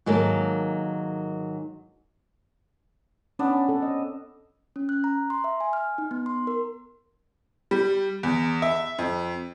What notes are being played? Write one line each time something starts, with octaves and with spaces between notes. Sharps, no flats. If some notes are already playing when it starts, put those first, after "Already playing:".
G#2 D#3 F#3 A#3 A4
B3 C#4 D4
C4 A4
D#5
C#4
F#6
A#5
C6
E5
G#5
F6
D#4
B3
C6
A#4
G3
E2
E5
F2